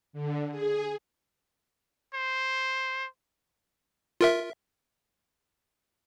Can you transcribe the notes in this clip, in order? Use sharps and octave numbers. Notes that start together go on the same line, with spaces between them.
D3
G#4
C5
F4 A#4 E5